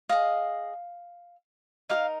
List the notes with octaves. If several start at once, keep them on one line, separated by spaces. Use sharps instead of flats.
G#4 D#5 F5
D#4 G4 A#4 F5